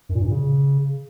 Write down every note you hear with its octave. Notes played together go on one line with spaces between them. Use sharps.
F#2
A#2
G2
A#2
C#3